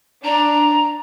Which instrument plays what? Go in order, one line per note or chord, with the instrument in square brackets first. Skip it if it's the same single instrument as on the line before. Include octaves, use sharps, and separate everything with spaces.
[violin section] D4 [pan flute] A#5